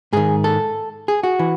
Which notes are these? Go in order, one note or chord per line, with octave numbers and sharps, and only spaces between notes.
G#2 D#3 G#4
A4
G#4
F#4
E3